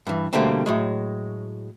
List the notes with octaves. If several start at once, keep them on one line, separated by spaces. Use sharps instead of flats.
G2 E3
B2 D3 G3 A3 A#3 C4
A2 F#3 G#3